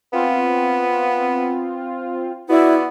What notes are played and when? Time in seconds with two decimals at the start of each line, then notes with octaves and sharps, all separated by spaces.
0.13 B3 C4 F4
2.49 B3 E4 F#4 D5 E5